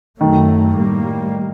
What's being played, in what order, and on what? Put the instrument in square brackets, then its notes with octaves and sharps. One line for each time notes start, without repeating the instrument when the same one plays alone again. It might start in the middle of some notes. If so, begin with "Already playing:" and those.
[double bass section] F#2 F#3 A3 [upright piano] D#3
[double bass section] A2 G3 A#3